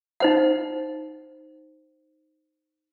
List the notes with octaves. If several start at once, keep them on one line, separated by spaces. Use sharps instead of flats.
D#4 C5 F#5